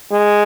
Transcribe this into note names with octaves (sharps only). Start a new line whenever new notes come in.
G#3